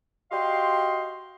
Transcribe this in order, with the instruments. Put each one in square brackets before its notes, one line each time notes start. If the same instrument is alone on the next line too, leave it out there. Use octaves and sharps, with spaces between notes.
[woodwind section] F#4 G4 D#5 F5 C6